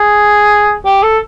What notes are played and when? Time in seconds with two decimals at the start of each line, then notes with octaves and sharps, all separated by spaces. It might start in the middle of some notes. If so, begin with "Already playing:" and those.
Already playing: G#4
0.85 G4
1.03 A4